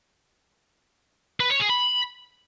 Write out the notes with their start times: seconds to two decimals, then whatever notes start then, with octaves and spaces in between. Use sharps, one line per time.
1.40 B4
1.50 C#5
1.60 G#4
1.70 B5